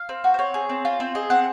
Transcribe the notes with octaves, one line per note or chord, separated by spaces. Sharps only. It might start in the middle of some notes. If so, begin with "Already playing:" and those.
Already playing: F5
C4
F#4
C5
C4 C#5
G#4
C4
F4
C4 C5
G#4 D#5
C4 F#5